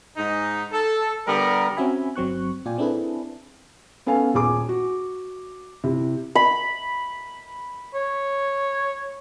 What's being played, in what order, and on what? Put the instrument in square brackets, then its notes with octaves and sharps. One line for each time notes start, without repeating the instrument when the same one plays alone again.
[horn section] G#2 D#4
A4
D3 G3 B3 A#4
[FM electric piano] C4 C#4 F#4 E5 G#5 B5
G1 F#3 C4 C#6 F#6
A#2 F4 D5 G5 G#5
C4 D4 E4 G#4 A4 B4
[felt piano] B3 C#4 A4 F5 G#5
D#1 G#4 D6
F#4
C3 E4
[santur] B5
[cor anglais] C#5